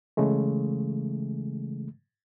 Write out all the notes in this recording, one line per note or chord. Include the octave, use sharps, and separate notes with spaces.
C#3 E3 G#3 A3